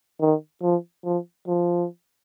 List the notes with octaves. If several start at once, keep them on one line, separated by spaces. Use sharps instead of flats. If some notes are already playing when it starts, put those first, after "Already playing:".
D#3
F3
F3
F3